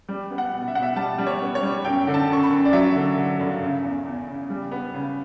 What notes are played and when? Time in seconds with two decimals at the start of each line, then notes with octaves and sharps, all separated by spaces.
0.09 G3
0.31 B3
0.38 F#5
0.53 B2
0.68 E5
0.75 B2 F#5
0.83 E5
0.96 G3 A5
1.18 G3
1.27 C#5
1.41 B3
1.55 C#5
1.63 G3
1.85 F#2 G5
2.07 D3
2.14 A5
2.29 F#2 C#6
2.43 B5
2.51 F#2
2.65 D5
2.73 F#3 E5
2.95 D3
3.17 D3
3.40 G2
3.62 C#3
3.83 E2
4.05 E2
4.28 C#3
4.50 G3
4.71 B3
4.94 C#3